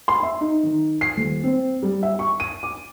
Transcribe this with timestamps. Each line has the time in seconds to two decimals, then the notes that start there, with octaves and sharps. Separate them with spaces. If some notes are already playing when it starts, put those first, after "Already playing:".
0.08 C6
0.23 E5
0.41 D#4
0.63 D#3
1.01 C7
1.16 D#1
1.44 C4
1.83 G3
2.03 E5
2.19 C#6
2.40 D#7
2.63 D6